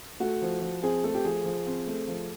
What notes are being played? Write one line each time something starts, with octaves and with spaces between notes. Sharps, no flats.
A3 F#4
F3
F3
C4 G#4
A3 A4
G4
F3 G#4
F3
C4
A3
F3